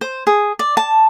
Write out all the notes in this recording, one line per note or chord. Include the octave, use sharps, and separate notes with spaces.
C5
G#4
D5
A5